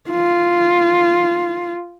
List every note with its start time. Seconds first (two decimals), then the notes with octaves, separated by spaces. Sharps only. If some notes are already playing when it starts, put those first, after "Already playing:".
0.10 F4